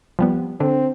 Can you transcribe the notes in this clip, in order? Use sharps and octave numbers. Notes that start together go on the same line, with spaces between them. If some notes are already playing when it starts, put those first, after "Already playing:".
F3 G3 B3
D3 C4 D4